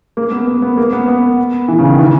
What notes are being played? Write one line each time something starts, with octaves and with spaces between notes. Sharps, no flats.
A#3
B3
B3
B3
A#3
B3
B3
E3
C#3
D#3
E3